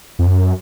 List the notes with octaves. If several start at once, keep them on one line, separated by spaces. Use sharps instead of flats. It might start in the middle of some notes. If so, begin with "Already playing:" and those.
F2
F#2